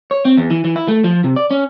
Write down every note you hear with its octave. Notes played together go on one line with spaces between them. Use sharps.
C#5
C4
E2
E3
E3
E4
A3
F3
C3
D5
C#4